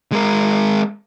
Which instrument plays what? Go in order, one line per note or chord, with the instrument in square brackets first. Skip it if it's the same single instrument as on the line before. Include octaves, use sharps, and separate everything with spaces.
[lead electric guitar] G#3 A#4